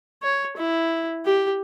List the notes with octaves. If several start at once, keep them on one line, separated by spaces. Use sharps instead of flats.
C#5
E4
G4